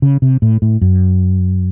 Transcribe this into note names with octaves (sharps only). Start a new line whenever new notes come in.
C#3
C3
A2
A2
F#2